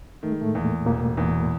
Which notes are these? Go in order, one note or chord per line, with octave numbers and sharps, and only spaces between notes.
D#3 A3
G#3
A2 A3
E2 A#2 A#3
E1 A#2 A#3
E2